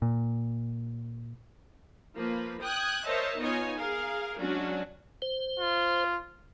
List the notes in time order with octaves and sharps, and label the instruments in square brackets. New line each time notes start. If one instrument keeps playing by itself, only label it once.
[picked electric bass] A#2
[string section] F3 A#3 B4
G5 D#6 F#6 G#6
A#4 C5 C#5 D#5 E5 A5
B3 D#4 F4 C#5 D#5 G#5
G#4 A#4 F5
F#3 G#3 C#4 D4 F#4
[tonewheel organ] C5
[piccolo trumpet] F4